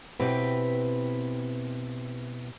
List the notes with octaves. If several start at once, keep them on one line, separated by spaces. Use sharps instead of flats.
B2 C4 E4 G4 B4